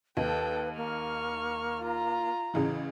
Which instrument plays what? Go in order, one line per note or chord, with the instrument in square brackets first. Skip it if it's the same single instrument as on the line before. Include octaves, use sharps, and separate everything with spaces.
[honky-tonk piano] D#2 [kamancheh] A4 G5 [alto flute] B4
[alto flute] A#3 [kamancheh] C#6 F6
[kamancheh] F4 A#5
[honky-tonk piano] A1 C#3 E3